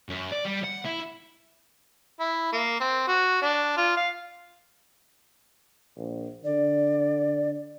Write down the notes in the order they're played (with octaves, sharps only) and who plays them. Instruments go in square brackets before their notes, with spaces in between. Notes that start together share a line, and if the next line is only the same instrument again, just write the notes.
[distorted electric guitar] F#2
D5
G3
F#5
E4
[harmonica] E4
A#3
C4
F#4
D4
F4
F5
[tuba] A#1
[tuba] D3 [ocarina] D5